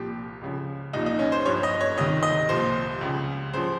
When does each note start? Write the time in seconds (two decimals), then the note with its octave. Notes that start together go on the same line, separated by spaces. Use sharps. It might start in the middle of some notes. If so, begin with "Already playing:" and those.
Already playing: C2 A#2 F3 G4
0.41 C#2 C#3 F3
0.93 C2 A#2 F3 D#4
1.06 D#4
1.19 C#4
1.32 C5
1.45 G2 F3 C#5
1.63 D#5
1.81 C#5
1.97 C2 C3 D#3 D#5
2.23 D#5
2.49 C2 A#2 F3 C5
3.01 C#2 C#3 F3
3.53 C#2 C#3 F3 C5